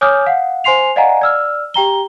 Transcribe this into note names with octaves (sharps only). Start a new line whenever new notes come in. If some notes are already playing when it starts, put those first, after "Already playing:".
C#5 G#5 D6 D#6 F6 G6
F5 F#5
C5 G#5 C6 C7 F7
D5 D#5 F5 F#5 G#5 A#5
D5 E6 F6
G4 G5 A#5 G7